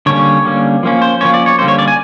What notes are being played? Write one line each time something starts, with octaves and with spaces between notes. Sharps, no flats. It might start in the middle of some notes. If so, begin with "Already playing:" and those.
D3 G3 A#3 C#4 C#5
D3 G3 A#3 C#4
F3 A#3 C#4
C5
F3 A#3 C#4 C#5
D5
C#5
D3 G3 A#3 C#4 C5
C#5
D5
G#5